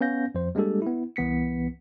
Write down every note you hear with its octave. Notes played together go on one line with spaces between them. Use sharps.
B3 C#4 F5 G6 A#6
F2 F3 C5
G3 G#3 A#3 D4 G4 A4
B3 E4
C2 E3 B3 B6 C#7